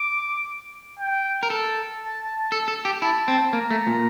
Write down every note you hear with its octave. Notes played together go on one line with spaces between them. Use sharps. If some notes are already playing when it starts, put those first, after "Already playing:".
Already playing: D6
G5
A#4
A4 A5
A4
A4
G4
E4 A5
C4
A#3 A#5
A3
A#2